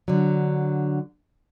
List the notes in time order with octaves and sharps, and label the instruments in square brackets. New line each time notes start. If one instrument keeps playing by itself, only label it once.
[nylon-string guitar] D3 F#3